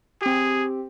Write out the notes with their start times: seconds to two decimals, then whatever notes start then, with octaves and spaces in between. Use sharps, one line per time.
0.21 C4 G4 G#4